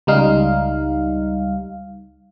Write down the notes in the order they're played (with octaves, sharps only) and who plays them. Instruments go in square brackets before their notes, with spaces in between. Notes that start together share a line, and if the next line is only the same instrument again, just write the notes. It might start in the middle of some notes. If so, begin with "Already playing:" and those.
[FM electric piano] C#2 G3 D#4 F5